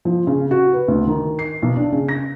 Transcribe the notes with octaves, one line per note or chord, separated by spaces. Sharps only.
F3
C#3
F#4
B4
D2
D#3
C7
B1
D4
C#3
A#6